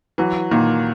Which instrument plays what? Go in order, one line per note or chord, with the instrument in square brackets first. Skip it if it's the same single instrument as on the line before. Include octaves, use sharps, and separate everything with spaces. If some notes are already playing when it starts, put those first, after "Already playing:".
[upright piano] E3 [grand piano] F#3
[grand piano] A#2 [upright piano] D#3